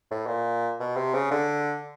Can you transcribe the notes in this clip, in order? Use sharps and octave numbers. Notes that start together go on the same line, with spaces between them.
A2
A#2
B2
C3
C#3
D3